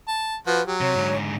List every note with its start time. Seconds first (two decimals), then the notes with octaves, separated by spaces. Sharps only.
0.08 A5
0.47 F3 F#4 B4
0.66 F#3 G4
0.81 C3 C#5
0.96 G#2 D3